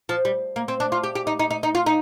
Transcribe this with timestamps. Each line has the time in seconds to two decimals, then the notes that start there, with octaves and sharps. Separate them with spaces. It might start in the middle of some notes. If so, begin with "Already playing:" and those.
0.09 F3
0.25 G3
0.56 A#3
0.68 C4
0.80 D4
0.92 F4
1.04 G4
1.15 G4
1.27 D#4
1.39 D#4
1.51 D#4
1.63 D#4
1.75 F4
1.86 D#4